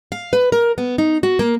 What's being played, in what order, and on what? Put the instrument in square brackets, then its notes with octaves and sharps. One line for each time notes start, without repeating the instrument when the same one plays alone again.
[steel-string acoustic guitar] F5
B4
A#4
B3
D#4
F#4
A#3